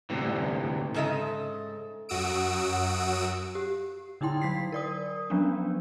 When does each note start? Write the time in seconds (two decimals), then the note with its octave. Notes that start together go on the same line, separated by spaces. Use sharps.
0.10 D2 A2 C3 E3
0.94 G#2 C#3 A4 D#5 E5
2.09 F#2 F#4 D#6 E6 D7
3.55 G4
4.21 D3 D#4 E4 G5 C6
4.42 F#3 B6 C7
4.72 A#4 D5 D#6
5.30 F3 F#3 B3 C#4 D4